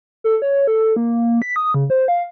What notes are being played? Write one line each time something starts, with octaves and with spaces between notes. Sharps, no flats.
A4
C#5
A4
A#3
B6
D#6
C#3
C5
F5